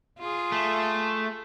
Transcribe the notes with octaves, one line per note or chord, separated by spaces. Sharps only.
F4 G#4
A3